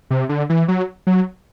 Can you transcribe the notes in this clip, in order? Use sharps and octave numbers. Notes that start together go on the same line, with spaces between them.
C3
D3
E3
F#3
F#3